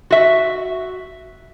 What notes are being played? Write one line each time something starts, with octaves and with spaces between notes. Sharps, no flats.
F#4 E5